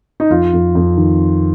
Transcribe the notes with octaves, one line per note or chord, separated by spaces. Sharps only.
D#4
F2 F4
F2
F2
D#3